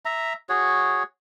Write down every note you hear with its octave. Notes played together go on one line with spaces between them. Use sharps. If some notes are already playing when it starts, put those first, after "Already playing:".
E5 A#5
F#4 G#4 C#5